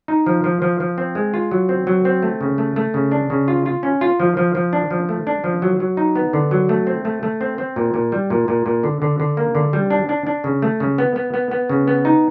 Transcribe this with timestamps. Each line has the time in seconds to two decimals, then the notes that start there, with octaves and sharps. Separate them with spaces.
0.08 D#4
0.26 F3
0.44 F3
0.62 F3
0.80 F3
0.98 C4
1.15 G#3
1.34 F4
1.51 F#3
1.69 C4
1.87 F#3
2.05 C4
2.22 A3
2.41 C#3
2.58 A3
2.76 A3
2.94 C#3
3.12 D4
3.30 C#3
3.48 F4
3.66 F4
3.83 C#4
4.01 F4
4.20 F3
4.37 F3
4.55 F3
4.73 D4
4.91 F3
5.09 A3
5.27 D4
5.44 F3
5.62 F#3
5.80 F#3
5.97 D#4
6.16 B3
6.33 D3
6.51 F#3
6.69 A3
6.87 C4
7.05 A3
7.23 A3
7.41 C4
7.58 C4
7.76 A#2
7.94 A#2
8.12 G3
8.30 A#2
8.48 A#2
8.66 A#2
8.83 D3
9.02 D3
9.20 D3
9.37 A#3
9.55 D3
9.73 G3
9.90 D4
10.09 D4
10.27 D4
10.44 C#3
10.62 A3
10.80 C#3
10.98 B3
11.16 B3
11.34 B3
11.51 B3
11.69 C#3
11.88 B3
12.05 D#4